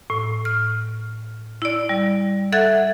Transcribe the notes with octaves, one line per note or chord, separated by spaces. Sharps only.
A2
F6
E4 D5
G3
A4 E5 F#5 F#6 G#6 A6